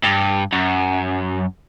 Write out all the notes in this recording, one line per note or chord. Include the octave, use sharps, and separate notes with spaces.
G2
F#2